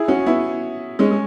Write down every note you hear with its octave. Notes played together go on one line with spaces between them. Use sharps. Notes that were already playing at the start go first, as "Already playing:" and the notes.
Already playing: E4 G#4
C#4 F#4
B3 E4
G#3 C#4
G#3